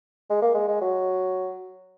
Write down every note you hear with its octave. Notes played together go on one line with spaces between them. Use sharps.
G#3
A#3
G#3
G#3
F#3